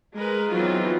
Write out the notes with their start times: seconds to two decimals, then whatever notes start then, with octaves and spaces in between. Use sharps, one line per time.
0.16 G#3 A#4 B4
0.50 E3 F#3 B3 C4 D#4 F4